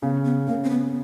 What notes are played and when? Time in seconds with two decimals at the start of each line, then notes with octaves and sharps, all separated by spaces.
0.02 C#3 B3
0.25 B3
0.47 C#3 A#3
0.64 C4
0.70 B3